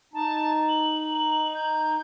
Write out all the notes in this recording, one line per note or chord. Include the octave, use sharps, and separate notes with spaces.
D#4 A5
F#7
G6